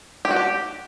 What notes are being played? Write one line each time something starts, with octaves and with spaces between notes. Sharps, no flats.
G4
F#4
G4